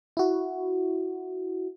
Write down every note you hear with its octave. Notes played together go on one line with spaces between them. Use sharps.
E4 F#4